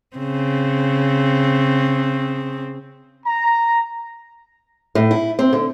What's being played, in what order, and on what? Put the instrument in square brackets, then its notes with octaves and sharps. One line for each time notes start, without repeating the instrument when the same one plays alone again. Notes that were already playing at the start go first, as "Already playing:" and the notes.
[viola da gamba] C#3 C4
[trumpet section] A#5
[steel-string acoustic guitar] A2
E4
C4
D3